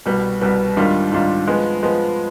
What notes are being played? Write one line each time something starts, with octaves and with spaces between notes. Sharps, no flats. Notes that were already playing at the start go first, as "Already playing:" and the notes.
C2 B2 G3 B3
C2 B2 G3 B3
G#2 D#3 G3 D4 F4
G#2 D#3 G3 D4 F4
F3 G#3 B3
F3 G#3 B3